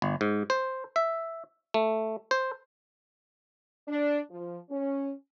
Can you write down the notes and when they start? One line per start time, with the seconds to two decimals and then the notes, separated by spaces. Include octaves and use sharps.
0.02 G1
0.21 G#2
0.50 C5
0.96 E5
1.74 A3
2.31 C5
3.88 D4
4.30 F3
4.70 C#4